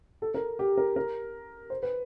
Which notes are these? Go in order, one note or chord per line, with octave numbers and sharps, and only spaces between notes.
A4
A#4
G4
A#4
A#4
C5
B4